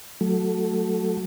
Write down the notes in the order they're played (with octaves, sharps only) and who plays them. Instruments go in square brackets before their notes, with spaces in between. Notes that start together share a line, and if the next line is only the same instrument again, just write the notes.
[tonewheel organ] F#3 A3